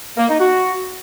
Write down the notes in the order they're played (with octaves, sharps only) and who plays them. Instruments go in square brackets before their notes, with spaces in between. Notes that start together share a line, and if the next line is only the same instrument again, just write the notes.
[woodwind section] A#3
D#4
F#4